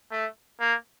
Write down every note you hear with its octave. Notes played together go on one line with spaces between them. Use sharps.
A3
A#3